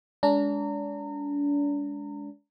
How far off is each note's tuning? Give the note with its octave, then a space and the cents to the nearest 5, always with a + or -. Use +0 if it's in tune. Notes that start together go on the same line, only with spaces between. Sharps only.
G#3 +0 D4 -35 A#5 -30